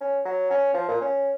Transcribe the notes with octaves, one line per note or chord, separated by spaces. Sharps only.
C#4
F#3
C#4
F3
A#2
C#4